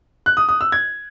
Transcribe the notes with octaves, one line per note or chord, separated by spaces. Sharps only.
F#6
D#6
D#6
E6
G#6